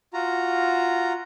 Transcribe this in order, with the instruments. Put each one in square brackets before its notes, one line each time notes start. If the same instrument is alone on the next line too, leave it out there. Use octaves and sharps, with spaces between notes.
[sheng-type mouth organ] F4 F#4 A#5